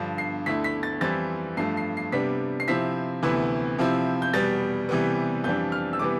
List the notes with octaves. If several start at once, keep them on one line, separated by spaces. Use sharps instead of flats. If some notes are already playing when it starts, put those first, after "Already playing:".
Already playing: G2 D3 F3
C7
D2 D3 A3 E4 B6
B6
A6
F2 E3 G3 C4 E4 A6
G2 F3 A3 C7
C7
C7
C3 G3 B3 D4 B6
C7
C3 F3 C4 E4 B6
D2 C3 E3 B3 E4
C3 F3 C4 E4
G6
E2 B2 G3 B3 A6
C3 E3 G3 B3
F2 E3 G3 D4 G6
F6
E6
C3 E3 G3 B3 D6